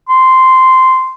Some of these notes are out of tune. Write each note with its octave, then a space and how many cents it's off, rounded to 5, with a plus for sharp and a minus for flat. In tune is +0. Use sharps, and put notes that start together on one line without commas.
C6 -10